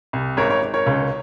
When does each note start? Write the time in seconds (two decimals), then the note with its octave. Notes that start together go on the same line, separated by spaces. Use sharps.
0.13 C2
0.37 G#1 A#4 C#5
0.50 A#4 C#5
0.62 G#1
0.74 A#4 C#5
0.86 C#2